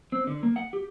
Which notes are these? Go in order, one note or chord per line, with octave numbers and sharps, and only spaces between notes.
C4
D3
A#3
F#5
G4